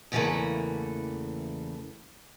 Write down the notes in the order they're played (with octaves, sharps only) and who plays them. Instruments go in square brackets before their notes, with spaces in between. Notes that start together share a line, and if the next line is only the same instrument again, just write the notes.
[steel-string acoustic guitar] E2 C#3 E3 F#3 A3 A#3